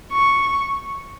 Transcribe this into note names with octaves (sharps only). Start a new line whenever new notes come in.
C#6